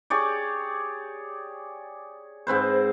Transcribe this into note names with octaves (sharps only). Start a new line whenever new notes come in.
G4 G#4 C#5 D5
G#2 C4 B4 C5